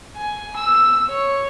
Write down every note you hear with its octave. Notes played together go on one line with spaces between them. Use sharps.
G#5
E6
C#5